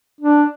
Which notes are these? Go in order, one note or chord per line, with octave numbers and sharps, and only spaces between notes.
D4